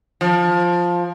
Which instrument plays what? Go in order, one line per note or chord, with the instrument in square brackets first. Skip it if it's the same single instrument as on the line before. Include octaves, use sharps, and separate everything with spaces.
[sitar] F3